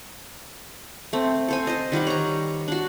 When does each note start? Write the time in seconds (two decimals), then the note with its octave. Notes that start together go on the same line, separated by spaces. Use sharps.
1.13 A3 C4
1.48 A4 C5 G#5
1.67 C5 D#5
1.92 D#3 G3 G4 F#5
2.07 C#5 A#5
2.68 D4 F#4